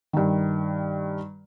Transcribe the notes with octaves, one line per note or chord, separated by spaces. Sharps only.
G2 D#3